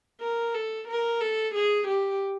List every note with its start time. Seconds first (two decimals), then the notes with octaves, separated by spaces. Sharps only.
0.21 A#4
0.54 A4
0.88 A#4
1.21 A4
1.54 G#4
1.87 G4